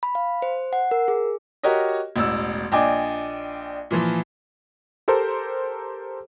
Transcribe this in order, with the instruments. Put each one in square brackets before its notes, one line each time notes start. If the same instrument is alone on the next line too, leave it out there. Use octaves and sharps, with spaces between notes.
[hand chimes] B5
F5
C5
F#5
A#4
G#4
[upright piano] F#4 G4 A#4 C#5 D#5
E1 A1 E6
A#1 D4 D#5 G5 G#5 D6
A#2 E3 F3
[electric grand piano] G4 A4 A#4 C5